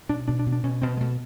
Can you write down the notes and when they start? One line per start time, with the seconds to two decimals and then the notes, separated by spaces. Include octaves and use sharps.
0.09 B2 D4
0.28 B2 D4
0.39 D4
0.46 B2
0.52 D4
0.63 B2 C#4
0.82 B2 C4
0.97 G#3
1.01 B2 A3